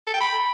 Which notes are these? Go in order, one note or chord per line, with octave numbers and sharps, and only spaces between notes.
A4
G5
B5